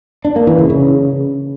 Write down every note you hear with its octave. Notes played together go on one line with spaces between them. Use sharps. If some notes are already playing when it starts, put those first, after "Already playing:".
D4
A#3
E3
C#3
C#3